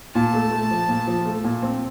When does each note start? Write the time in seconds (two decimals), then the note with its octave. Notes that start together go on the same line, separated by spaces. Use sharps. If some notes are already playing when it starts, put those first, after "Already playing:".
0.15 A#2 A5
0.34 A3
0.52 A3
0.71 F3
0.89 A#2
1.07 F3
1.26 A3
1.44 A#2
1.63 C4